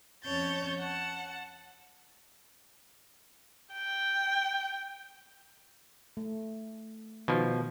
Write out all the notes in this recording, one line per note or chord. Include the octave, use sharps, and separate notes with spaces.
F2 C#4 C#5 A5 G6 A6
F#5 A5
G5
A3
B2 D#3 F3